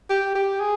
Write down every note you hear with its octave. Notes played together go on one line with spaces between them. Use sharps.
G4
G4
G#4